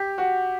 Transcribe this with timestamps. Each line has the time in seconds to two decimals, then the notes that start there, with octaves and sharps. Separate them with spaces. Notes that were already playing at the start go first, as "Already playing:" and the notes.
Already playing: G4
0.18 F#4